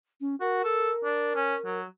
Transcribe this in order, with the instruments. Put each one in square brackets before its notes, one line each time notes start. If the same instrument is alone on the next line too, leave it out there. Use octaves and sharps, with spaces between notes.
[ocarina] C#4
[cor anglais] F#4 [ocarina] A#4
[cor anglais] A4
D4
C#4
F#3